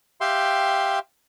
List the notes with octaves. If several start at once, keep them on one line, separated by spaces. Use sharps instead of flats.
G4 E5 F5 G5 C6